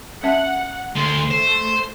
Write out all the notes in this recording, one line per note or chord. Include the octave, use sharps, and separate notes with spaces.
C#4 E5 F#5 A5
D2 C6
A3 C5